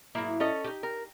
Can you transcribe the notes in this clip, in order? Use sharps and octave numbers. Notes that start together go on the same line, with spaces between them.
G#2 F#3 A#3 E4
C#4 A4 D#5
D#4 G4
A#4